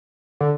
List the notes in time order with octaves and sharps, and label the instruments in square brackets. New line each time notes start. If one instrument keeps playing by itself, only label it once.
[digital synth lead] D3